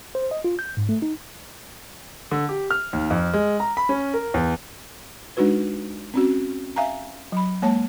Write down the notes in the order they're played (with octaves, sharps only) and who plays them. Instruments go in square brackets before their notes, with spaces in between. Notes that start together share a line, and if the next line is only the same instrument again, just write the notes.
[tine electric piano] C5
D#5
F4
G6
G#2
A3
D#4
[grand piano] D3
G4
F6
D#2
F2
G#3
A#5
B5
C#4
A#4
E2
[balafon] G#3 D4 D#4 F#4 B4
C4 C#4 F#4
E5 F5 G#5 A#5
F#3 B5
G#3 A#3 C#5 A5